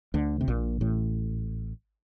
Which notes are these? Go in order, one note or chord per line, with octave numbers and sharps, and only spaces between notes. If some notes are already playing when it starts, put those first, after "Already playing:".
D2 D3
C3
A#1 A#2
A1 A2